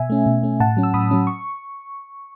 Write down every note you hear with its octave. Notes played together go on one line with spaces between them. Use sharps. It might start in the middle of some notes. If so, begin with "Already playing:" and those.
Already playing: B2 E5 G#5
A3 C#4
B2
A3 C#4
A2 F#5 A5
F#3 C#4
E6
A2 B5 D#6
F#3 C#4
C#6